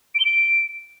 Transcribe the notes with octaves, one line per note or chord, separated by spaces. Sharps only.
D7
G7
D7